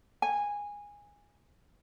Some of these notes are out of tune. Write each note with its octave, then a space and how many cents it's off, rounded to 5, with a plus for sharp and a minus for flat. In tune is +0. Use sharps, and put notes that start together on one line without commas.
G#5 -15